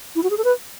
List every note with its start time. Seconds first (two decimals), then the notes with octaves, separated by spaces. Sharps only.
0.16 E4
0.23 F#4
0.30 G#4
0.38 A4
0.44 B4